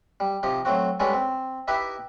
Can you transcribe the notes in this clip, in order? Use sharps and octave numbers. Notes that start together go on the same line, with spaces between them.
G3
C3 F3 D#4 G4
F#3 A3 C4 F#4
G3 G#3 C#4 F#4 A4 B4
C4
D#4 E4 G4 B4 E5